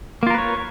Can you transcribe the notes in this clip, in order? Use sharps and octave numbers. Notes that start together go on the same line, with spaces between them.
A#3 F4 A#4 B4 C#5